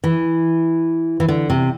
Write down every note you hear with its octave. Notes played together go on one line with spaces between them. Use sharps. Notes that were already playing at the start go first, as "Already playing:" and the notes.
E3
E3
D3
C3